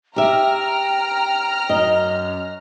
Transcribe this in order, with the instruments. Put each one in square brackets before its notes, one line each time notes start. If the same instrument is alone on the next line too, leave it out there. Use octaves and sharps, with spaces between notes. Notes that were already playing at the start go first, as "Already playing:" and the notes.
[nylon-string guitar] G4 E5 [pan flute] G5 [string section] A#5 F6
[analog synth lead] F#2 [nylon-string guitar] D#5